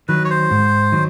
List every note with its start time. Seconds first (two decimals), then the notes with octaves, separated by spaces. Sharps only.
0.08 D#3 F#3 B4
0.25 C#5
0.30 C5
0.51 G#2
0.92 D#3 F#3